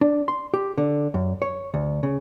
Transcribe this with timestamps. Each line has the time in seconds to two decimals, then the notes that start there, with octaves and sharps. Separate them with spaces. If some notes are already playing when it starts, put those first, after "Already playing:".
0.01 D4
0.28 C6
0.54 G4
0.78 D3
1.14 F#2
1.42 C#5
1.74 D2
2.03 C#3